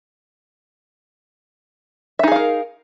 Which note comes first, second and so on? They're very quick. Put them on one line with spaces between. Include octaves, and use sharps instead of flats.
E5 D#4 G#4 F5 A#4